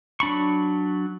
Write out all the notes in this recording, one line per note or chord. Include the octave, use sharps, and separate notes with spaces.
F#3 D4 B5 C#6